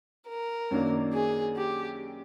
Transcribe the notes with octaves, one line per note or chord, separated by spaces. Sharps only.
A#4
F#2 D#3 F#3 A#3 D4
G#4
G4